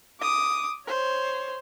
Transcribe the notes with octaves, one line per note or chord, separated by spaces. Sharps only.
D6 D#6
C5 C#5